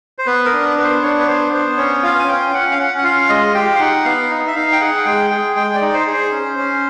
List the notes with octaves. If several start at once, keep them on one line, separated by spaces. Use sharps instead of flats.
C5
B3 B4
A#4
D4
B4
B3 B4
C5
D4 C#5
B4
B3 C5
B3 C5
C#4 C#5
F4 F5
G#5
C#4 G5
C#4 F#5
F5
C#4 F#5
F#5
F4 F5
G#3 D#5
G4 G5
F5
D#4 F#5
B3 F5
D#4
E5
D#4 F5
G5
G#4 F#5
G#3 G5
G#4 G5
G#3 G5
D5
D#4
C5
G#4
C5
C#4
C#4